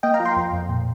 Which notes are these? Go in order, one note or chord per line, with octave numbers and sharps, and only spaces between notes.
A#3 D#5 G5
F5 A#5
F3
G5 C6
F2
F2
A#2